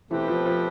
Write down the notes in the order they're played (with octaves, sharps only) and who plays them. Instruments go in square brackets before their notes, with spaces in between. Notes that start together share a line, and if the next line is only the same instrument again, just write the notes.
[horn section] B2 A3 C4 G4 B4 [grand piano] E3
[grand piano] F3
F3